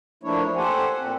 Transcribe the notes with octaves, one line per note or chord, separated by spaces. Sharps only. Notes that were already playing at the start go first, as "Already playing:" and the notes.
F3 A3 A#3 D4 E4 C#5
G4 A4 C5 F#5 G#5
A#2 C4